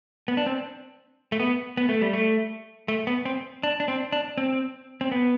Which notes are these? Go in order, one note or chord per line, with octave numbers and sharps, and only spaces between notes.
B3
D4
C4
A3
B3
B3
A3
G3
A3
A3
B3
C4
D4
D4
C4
D4
C4
C4
B3